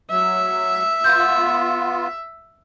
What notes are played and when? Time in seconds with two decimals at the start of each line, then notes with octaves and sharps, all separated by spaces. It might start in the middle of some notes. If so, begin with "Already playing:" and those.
0.11 F#3 E5
1.04 B3 F4 G6